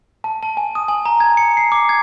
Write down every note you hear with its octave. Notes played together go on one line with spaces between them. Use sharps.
A5
A5
G#5
D#6
G#5
A#5
G#6
C#7
C7
D6
G#6